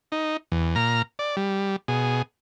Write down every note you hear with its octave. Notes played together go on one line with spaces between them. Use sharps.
D#4
E2
A#2 A#5 F6
D5
G3
B2 G#4